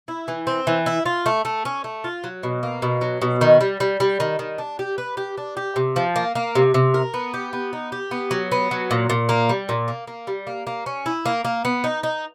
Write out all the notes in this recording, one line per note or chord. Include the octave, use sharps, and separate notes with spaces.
E4
E3
C4
E3
E4
F4
A3
A3
C#4
A3
F4
F#3
B2
A#3
B2
F#3
B2
D#3
G3
G3
G3
D#3
D#3
D4
G4
B4
G4
D4
G4
C3
F3
A#3
A#3
C3
C3
A#4
B3
G4
B3
D#4
G4
B3
F#3
B3
F#3
A#2
A#2
A#3
G3
A#2
A#3
A#3
G3
A#3
A#3
C#4
E4
A#3
A#3
B3
D#4
D#4